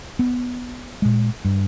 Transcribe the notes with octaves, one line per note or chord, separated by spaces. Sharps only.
B3
A#2 G#3
G2